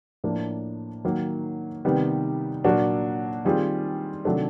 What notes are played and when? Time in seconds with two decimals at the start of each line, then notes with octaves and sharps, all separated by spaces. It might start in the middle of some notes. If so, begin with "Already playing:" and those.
0.24 A2 F3 A#3 D4
1.05 D#3 F#3 A#3
1.85 C3 D#3 G3 B3
2.64 A#2 F#3 A#3 D4 F#4
3.45 D#3 G3 C4 F4 G#4
4.25 C3 D#3 F#3 A3 D4